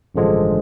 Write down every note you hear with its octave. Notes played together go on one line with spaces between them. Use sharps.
A1 G2 D3 F3 G#3